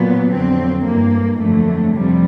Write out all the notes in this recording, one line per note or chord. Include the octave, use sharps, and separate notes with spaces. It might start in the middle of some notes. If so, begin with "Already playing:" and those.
Already playing: A#2 F#3 B3
F2 D3 F#3 C4
G2 E3 A#3
F2 D3 F#3 A3
F2 C3 F3 G3